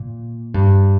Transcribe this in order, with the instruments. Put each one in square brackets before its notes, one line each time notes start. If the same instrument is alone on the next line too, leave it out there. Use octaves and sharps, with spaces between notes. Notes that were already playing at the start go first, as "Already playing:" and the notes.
Already playing: [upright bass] A#2
G2